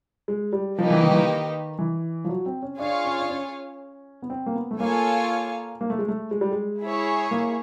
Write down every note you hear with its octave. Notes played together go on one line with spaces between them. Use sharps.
G#3
G3
F3 A#3 D#4 G4 B4 D#5
E3
D#3
E3
D#3
E3
F3
F#3
C4
C#4
D4 F4 G#4 C#5 F5
C#4
D4
C#4
B3
C4
A#3
B3
A3
A#3 F4 A4 C#5 F5 G#5
A#3
A3
G#3
A3
G#3
G3
G#3
E4 G#4 C#5
A#3